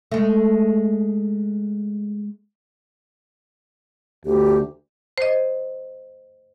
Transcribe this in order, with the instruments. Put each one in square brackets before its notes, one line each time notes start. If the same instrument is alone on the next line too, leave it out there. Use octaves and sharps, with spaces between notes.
[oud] G#3 A3
[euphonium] D2 [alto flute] G4
[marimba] C5 D#5